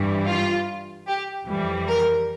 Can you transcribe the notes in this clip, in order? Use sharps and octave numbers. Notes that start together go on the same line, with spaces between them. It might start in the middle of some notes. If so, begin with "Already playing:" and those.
Already playing: G2 E3 G3
F4
G4
F2 E3 G3
A#4